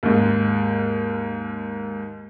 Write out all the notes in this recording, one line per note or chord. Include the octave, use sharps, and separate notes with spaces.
D#2 G#2